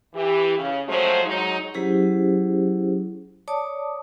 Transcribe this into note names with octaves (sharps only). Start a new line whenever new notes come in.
E3 G4
C#3
F3 F#3 G#3 A3 C5
F#3 G#3 D#4
F#3 C#4 E4 G4 G#4 C5
C#5 D5 A5 D6 D#6